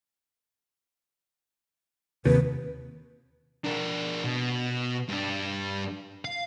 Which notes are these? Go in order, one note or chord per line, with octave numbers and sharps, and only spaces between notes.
D#2 C3 B4
D4 A#4
B2
G2 D4
F5